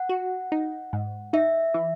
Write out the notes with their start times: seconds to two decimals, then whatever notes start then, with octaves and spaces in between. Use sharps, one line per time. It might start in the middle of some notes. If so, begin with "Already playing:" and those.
Already playing: F#5
0.09 F#4
0.52 D#4
0.93 G#2
1.33 D#4 E5
1.74 E3